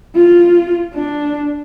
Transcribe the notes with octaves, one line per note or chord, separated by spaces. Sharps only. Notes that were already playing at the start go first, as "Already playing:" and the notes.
F4
D4